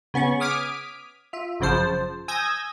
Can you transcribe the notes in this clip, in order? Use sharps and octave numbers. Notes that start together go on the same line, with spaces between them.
C#3 B3 C#4 C#6
D6 D#6 F6 G#6 B6 D7
F4 E5
G#1 F#2 C#3 F3 C5 A5
G#5 D#6 E6 G6 G#6 A#6